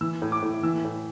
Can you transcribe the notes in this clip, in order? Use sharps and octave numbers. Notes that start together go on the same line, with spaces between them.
E3 E6
A2
D6
A2
E3 E6
A2